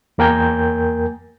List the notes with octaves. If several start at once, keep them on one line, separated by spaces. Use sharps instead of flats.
E2 A#3 A#4 G5 G#5 G6